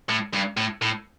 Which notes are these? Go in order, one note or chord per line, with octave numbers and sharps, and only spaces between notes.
A2
G2
A2
A2